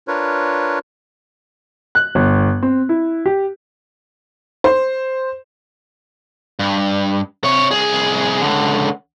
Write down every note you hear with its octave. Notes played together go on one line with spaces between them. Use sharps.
D4 F4 A#4 B4 C#5
F#6
G1
C4
E4
G4
C5
G2
C3 C#5
C2 G#4
C#2 D3